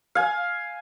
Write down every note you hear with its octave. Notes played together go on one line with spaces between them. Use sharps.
F5 G#5